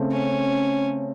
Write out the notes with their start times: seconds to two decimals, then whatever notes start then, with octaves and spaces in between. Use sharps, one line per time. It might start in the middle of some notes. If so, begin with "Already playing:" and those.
Already playing: C#3 A3 C4
0.11 C#4